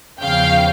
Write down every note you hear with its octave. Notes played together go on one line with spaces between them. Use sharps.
E2 C#3 F3 F5 G5